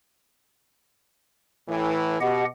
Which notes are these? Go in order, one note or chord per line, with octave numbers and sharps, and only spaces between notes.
A2 E3
B2 G4 D#5 F#5